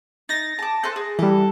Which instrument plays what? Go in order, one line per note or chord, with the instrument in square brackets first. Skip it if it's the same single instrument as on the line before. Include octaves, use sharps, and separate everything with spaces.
[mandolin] D#4 [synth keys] A6 A#6
[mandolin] A5 D6
A4 B4 C5
G#4
[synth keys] E3 G3 [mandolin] A4